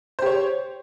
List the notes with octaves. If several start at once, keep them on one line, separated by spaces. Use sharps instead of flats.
G4 C5 C#5